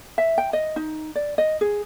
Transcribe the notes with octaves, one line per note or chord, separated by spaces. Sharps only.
E5
G5
D#5
D#4
D5
D#5
G#4